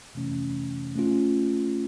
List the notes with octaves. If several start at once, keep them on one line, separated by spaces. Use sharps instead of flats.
F2 C3 E3 A3 C#4
A3 C#4 F4